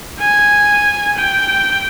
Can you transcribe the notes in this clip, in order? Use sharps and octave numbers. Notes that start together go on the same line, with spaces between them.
G#5
G5